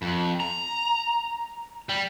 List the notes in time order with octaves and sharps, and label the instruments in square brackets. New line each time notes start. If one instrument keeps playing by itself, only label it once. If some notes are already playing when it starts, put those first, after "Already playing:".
[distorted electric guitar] F2
A#5
G3